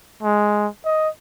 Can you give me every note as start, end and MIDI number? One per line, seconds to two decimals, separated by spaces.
0.23 0.68 56
0.86 1.09 75